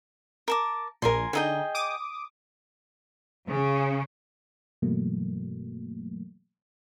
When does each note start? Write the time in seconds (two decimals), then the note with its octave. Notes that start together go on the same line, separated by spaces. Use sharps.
0.48 A#4 A5 D6
1.02 A#1 A#2 A#4 G#5 C6
1.33 D3 D#4 G#4 D#5 G5
1.75 D6 D#6
3.47 C#3
4.82 G2 B2 E3 F#3 A3 A#3